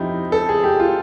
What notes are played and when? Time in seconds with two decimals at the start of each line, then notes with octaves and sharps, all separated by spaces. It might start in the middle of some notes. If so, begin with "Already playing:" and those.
Already playing: F2 F3 D#4 E4 G4
0.32 A4
0.49 G#4
0.64 G4
0.80 F4